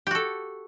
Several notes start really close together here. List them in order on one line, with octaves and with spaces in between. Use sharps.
G4 F#4 A4